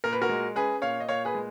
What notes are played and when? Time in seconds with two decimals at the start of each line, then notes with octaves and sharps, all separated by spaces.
0.04 A#2 A#4
0.13 B4
0.22 F#4 A#4
0.29 G#3
0.55 C#4 G#4 B4
0.82 A#2 C#5 F5
1.00 D#5
1.08 A#2 C#5 F5
1.25 G#4 B4
1.35 G#3